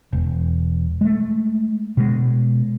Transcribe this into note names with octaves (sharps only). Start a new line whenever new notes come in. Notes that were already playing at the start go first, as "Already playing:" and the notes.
E1
G#3 A3
B2 G#3